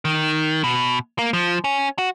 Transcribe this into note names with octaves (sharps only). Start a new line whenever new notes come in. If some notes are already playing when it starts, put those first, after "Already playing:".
D#3
B2
A#3
F3
C#4
F#4